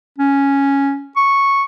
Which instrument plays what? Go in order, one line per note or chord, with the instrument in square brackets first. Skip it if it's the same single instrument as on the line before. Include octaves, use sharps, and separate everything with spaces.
[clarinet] C#4
C#6